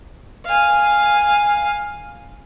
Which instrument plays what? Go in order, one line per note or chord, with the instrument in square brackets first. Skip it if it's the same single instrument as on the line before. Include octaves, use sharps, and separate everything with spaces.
[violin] F5 G#5